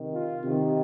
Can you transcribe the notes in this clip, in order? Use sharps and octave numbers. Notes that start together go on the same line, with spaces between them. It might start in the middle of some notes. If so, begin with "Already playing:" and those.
Already playing: C3 D#3
F4
C3 D#3